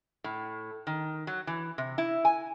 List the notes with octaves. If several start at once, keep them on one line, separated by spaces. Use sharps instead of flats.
A2
D#3
F#3
E3
C3
E4
G#5